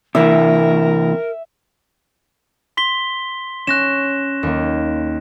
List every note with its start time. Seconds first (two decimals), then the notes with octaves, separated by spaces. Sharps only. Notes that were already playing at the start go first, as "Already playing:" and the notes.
0.15 C3 E3 A#4 E5
2.77 C6 B6 G7
3.67 C#4 F#6 A#6 E7
4.43 D#2 A#3